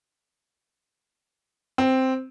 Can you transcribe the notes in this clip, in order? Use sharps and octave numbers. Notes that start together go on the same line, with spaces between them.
C4